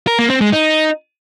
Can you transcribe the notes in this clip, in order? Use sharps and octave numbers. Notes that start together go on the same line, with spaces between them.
A#4
A#3
C4
G#3
D#4